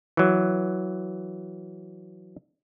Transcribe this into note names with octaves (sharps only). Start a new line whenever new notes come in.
E3 F#3